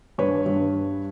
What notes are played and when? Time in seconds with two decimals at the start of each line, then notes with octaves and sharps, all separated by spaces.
0.18 G2 B4 C#5
0.46 G2